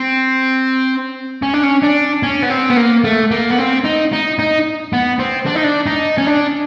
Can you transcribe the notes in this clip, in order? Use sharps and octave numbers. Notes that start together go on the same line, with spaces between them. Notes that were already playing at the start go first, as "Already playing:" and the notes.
Already playing: C4
C#4
D4
C#4
D4
C#4
B3
C4
B3
A#3
A3
A#3
B3
C4
D#4
D#4
D#4
B3
C4
D4
D#4
D4
D#4
C#4
D4